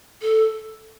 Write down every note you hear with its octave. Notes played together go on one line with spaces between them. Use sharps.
A4